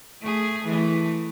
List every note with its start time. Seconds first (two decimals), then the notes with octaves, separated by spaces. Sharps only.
0.21 A3 G#4
0.64 E3 A3